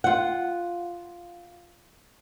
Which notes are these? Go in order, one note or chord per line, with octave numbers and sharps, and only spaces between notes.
F4 F#5